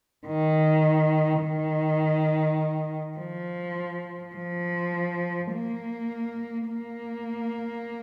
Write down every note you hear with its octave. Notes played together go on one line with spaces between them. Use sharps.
D#3
D#3
F3
F3
A#3
A#3